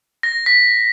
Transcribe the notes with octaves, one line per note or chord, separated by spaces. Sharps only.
A#6
B6